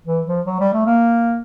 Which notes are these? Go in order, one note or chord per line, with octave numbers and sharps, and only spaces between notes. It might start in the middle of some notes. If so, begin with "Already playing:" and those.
E3
F3
F#3
G3
A3
A#3